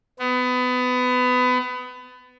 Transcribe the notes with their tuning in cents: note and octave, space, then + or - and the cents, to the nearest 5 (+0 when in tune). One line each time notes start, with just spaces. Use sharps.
B3 +25